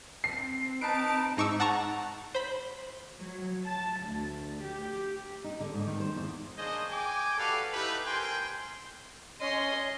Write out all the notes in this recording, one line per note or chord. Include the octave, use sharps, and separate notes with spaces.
C4 C7
D#4 B4 A5 D7
G#2 D#4 C#6 D6 E6
F#5 A5 A#5 C#6
C5 B5
F#3
A5
D2
G4
D#4
D3
G#2
D#3
C5
E2
A#3 D4 G#4 C5 C#5 D#5
G5 G#5 D6
F#4 G4 A4 B4 D5 F5
D#4 E4 G4 A4 B4
A#4 C5 G5 G#5 C6
C#4 C#5 D#5 C6